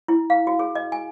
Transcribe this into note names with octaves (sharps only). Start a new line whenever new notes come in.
E4
F5
F#4
G#4
D#5
G#5